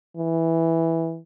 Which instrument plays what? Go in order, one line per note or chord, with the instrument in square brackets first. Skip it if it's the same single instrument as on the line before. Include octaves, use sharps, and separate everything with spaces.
[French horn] E3